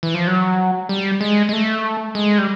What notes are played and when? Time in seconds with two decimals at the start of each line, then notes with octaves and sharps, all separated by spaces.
0.03 E3
0.14 F3
0.27 F#3
0.89 G3
1.21 G#3
1.49 G#3
1.53 A3
2.15 G#3
2.38 G3